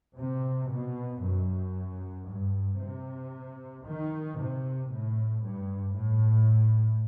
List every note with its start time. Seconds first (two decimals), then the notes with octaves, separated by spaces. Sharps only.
0.17 C3
0.70 B2
1.23 F#2
2.28 G2
2.80 C3
3.86 D#3
4.38 C3
4.90 A2
5.43 G2
5.95 A2